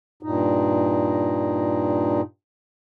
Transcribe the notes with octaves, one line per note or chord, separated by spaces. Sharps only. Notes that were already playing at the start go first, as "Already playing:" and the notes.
G2 A#2 D#4